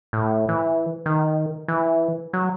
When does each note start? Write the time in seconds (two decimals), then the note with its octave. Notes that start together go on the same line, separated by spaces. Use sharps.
0.13 A2
0.49 E3
1.06 D#3
1.68 E3
2.33 F#3